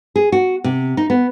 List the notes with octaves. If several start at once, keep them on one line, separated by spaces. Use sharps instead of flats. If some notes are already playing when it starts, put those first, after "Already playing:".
G#4
F#4
C3
D#4
B3